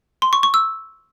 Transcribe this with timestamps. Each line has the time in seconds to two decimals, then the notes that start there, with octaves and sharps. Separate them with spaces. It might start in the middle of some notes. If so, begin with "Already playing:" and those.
0.22 C6
0.33 C#6
0.43 C#6
0.54 E6